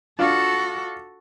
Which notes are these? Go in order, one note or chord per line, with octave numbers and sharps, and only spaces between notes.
D4 F4 F#4 A4